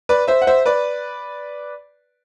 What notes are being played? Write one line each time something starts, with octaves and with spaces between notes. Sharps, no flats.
B4 D5
C5 E5
F#5
C5 E5
B4 D5